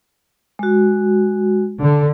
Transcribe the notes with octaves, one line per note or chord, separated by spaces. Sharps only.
G#3 F#4
D3